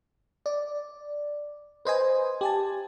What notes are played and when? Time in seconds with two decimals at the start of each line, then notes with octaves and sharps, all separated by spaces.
0.46 D5
1.85 B4 C5 D#5 G#5
2.41 G4 G#5 A5